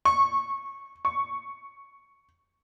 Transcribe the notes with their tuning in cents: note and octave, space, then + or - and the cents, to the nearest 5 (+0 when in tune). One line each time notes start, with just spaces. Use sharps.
C#6 -15
C#6 +0